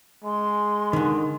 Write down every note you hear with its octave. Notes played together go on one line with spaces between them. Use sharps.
G#3 C6
D3 D#3